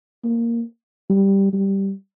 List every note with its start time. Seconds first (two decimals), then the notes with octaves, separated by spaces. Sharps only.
0.24 A#3
1.10 G3
1.53 G3